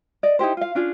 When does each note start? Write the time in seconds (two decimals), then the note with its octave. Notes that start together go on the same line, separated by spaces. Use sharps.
0.23 D5 D#5
0.39 D#4 E4 G4 C5
0.57 F4 F5
0.75 C#4 D4 F4 G#4